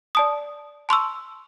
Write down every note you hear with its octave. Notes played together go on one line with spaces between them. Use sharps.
D5 A5 D#6
A5 C6 C#6 E6